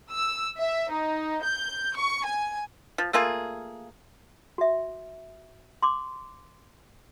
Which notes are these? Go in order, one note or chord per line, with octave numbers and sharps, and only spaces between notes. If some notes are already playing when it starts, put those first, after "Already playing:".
E6
E5
D#4
G6
C#6
G#5
F3
A3 A#3 F4 G#4
F#4 E5
C6 D6